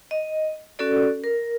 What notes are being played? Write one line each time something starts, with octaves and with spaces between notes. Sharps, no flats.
D#5
C#4 F#4 A4 D5
A#4